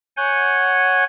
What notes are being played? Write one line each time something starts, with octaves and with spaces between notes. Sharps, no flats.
C#5 F#5 G#5 G6